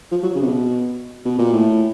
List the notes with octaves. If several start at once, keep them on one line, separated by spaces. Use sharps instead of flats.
F3
F#3
C#3
C3
B2
B2
A#2
A2